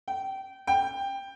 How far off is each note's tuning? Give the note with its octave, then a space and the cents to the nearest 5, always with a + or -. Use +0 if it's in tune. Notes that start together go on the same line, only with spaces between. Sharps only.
G5 -25
G5 +10